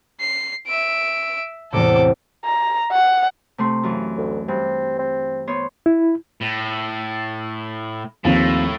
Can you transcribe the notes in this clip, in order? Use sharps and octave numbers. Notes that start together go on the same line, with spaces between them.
C7
E5 D7
E2 A2 C3 A4 D6
A#5
F#5
C3 A3 C6
F#2 E3 F4
D2
G2 C4
C4
B3 C5 C#5
E4
A2
D#2 A2 F3 C4